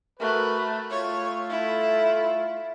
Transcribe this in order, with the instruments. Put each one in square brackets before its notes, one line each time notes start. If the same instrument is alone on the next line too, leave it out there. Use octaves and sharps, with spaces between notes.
[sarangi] A3 [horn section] F#4 A#4 B4
[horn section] A3 F4 [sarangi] C#5
[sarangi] E4